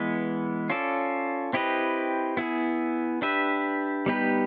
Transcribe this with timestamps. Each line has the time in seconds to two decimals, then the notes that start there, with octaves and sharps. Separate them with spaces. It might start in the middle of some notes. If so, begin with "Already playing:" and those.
Already playing: E3 G#3 B3
0.70 C#4 F4 A4 D5
1.53 C4 E4 G4 B4 D#5
2.37 B3 E4 G#4
3.22 D4 G4 B4 E5
4.06 G3 B3 D#4 G4 B4